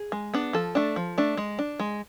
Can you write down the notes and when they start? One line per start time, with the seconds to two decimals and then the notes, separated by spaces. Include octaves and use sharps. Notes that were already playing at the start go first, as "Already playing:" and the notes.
Already playing: G#4
0.12 G#3
0.34 B3 D4
0.53 F3 A4
0.75 A3 D4
0.96 F3
1.18 A3 D4
1.37 G#3
1.59 D4
1.79 G#3